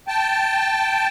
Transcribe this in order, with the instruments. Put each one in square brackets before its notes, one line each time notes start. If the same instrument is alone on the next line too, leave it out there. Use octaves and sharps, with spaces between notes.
[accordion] G5 A5